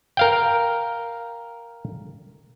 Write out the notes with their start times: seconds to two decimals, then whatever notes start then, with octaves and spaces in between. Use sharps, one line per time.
0.17 A#4 F5 G5